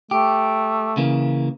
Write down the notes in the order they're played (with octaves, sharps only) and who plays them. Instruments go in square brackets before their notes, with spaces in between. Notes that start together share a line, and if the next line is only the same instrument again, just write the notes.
[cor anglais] A3 [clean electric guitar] G4
[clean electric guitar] C#3 E3 A#3